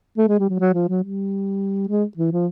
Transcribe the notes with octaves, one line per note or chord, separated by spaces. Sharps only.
A3
G#3
G3
F#3
F#3
F3
F#3
G3
G#3
E3
F3